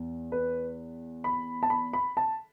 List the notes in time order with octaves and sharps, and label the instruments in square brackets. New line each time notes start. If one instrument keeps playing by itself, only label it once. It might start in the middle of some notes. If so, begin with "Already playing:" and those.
Already playing: [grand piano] E2
B4
B5
A5
B5
B5
A5